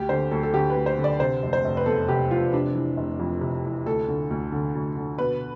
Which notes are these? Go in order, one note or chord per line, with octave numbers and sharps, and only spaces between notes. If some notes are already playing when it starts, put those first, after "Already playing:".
Already playing: D2 G4
D3 C5
D2 A4
A4
D3 G4
B4
D2
C5
D3
D5
C3 C5
F1
C5
F1
B4
E2 A4
C3 G4
F1 F4
C3 D4
E3
F1
F2
C3
E3
D2 A4
D3
D2
D3
D2
D3
B2 B4